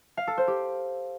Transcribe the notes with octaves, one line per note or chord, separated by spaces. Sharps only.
F5
A4
C5
G4